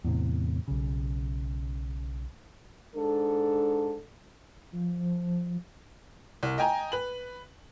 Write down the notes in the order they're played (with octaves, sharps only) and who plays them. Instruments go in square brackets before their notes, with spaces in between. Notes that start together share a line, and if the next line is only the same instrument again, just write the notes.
[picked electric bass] E2 A2 C3
B1 C#3
[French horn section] G#2 D4 A4
[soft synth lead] F3
[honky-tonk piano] C2
D#5 G5 G#5 A#5
B4 F#7